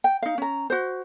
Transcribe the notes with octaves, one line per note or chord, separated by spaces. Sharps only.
G5
D#4 F5
C#4 A#5
F#4 C5